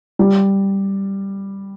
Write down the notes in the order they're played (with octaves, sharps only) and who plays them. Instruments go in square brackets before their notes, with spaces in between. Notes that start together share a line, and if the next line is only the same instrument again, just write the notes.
[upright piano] G3